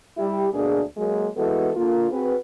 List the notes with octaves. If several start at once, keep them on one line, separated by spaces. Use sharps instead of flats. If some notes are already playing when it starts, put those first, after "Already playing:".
G3 E4 G4
D2 B2 A#3 D4 G#4
F#3 G#3 A#3
E3 G#3 B3 F#4 A4
D3 A#3 F4
C4 F#4 G#4 B4